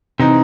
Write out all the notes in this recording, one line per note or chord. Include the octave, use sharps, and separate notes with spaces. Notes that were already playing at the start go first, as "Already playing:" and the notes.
C3 E3 C4 D#4